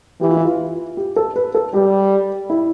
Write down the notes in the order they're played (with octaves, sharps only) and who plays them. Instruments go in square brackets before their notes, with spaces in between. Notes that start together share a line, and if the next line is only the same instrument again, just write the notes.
[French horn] E3 [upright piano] G4
[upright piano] F4
E4
F4
G4
A4
B4
A4
[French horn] G3 [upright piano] G4
[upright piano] E4